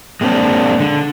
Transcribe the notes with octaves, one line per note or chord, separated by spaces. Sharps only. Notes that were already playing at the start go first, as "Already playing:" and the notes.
G#3 A#3 C4 D4
D3